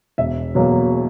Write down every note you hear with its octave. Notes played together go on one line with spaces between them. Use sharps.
E1 E5
E2 B2 F#3 A#3